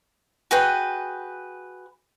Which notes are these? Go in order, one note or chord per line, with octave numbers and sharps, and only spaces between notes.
F#4 G#4 B4 G5